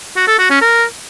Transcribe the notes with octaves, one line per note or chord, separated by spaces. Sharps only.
F#4
A4
F#4
C#4
A#4